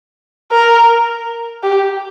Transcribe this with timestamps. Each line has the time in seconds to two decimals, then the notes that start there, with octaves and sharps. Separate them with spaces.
0.51 A#4
1.63 G4